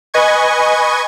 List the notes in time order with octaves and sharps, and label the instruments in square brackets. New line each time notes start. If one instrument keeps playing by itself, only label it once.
[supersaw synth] B4 D#5 G#5 C#6 G#6